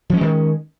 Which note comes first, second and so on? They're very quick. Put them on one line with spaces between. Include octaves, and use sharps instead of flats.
F3 C#4 G#3 D#3